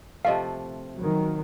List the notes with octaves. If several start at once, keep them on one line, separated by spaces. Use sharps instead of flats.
C3 F3 A3 D#5 F5
D#3 F#3